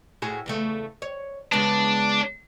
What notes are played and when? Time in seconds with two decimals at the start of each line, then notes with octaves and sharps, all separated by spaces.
0.22 A2 F#4 G#4
0.46 E2 C#3 A3
1.02 C#5
1.52 C#3 G#3 B3 D4